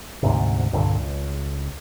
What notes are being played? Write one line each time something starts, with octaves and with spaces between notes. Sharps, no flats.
D2 G#2 C3
C2 G2 A#2 D3
C#2